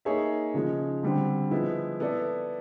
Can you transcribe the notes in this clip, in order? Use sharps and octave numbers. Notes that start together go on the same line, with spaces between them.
A#3 D#4 G#4 C#5 E5
C#3 F3 G#3
D3 G3 C4
F3 G#3 B3 E4
B3 E4 A4 D5